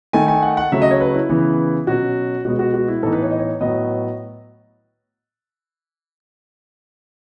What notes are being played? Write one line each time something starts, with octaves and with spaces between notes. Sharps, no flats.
D#3 A3 D#4 G#5
G#5
F#5
F#5
C#3 F#3 A3 C#4 E5
D#5
C#5
B4
E4
C#3 E3 B3
B2 F#3 C#4 F#4
B2 G#3 B3 F#4
F#4
F#4
E4
A2 E3 B3 D#4 A4
B4
C#5
D#5
C#5
A2 F#3 B3 D#5